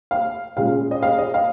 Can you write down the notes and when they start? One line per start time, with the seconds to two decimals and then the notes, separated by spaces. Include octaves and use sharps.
0.11 F5
0.57 A#2 G#3 C#4 F5
0.91 D#5
1.03 F5
1.18 D#5
1.34 F5